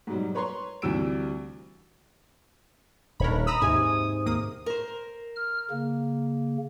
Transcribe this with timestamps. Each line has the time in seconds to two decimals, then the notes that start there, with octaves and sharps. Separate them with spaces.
0.07 G#2 B2 F#3 G3
0.35 B4 C#5 A#5 C6 C#6
0.82 D2 C3 E3 G3 E6 D7
3.20 D#1 D#3 D4 A#4 C#5 B5
3.47 A#5 B5 D#6 E6
3.62 D#2 G#2 C3 G#5
4.26 D#2 A#3 D#6
4.66 A#4 C5
5.36 F6
5.71 C#3 A#3